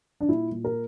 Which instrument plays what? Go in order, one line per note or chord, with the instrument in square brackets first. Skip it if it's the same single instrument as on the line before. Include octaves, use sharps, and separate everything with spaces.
[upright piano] D4
A#2 E4
A#2
A#4